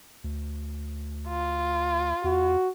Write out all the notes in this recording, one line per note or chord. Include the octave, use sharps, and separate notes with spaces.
D2
F4
E2 F#4